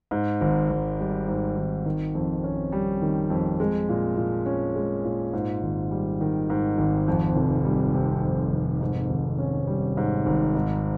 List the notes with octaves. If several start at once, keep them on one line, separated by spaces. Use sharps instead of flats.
G#2
G#1
G#1
G3
G#2
G#1
D#3
F2
C#4
G3
D#3
F2
G#3
A#2
A#2
C#4
G#3
A#2
G#2
G#1
G3
D#3
G#2
G#1
F2
F1
G3
C3
F2
F1
G#2
G#1
C#4
G3
G#2
G#1
G#2